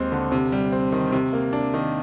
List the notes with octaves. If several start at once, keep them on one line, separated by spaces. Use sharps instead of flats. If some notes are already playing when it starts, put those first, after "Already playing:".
Already playing: D#2 G#3 C4
D3
C3
G3
C4
D#3
C3
A#3
D4
D#3